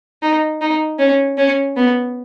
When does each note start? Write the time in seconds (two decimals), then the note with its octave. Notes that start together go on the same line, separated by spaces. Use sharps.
0.22 D#4
0.61 D#4
0.99 C#4
1.37 C#4
1.77 B3